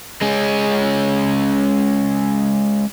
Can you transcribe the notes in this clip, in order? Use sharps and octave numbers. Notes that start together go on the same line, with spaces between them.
G#3 C#4